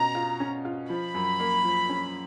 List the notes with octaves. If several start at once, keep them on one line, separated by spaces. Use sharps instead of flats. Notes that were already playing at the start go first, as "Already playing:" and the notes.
Already playing: B2 C#4 A#5
F4
C#4
F4
F3 B5
F#2
A#3
F3
C#4